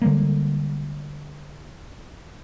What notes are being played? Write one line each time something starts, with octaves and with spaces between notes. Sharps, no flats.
D3 G3 G#3 A#3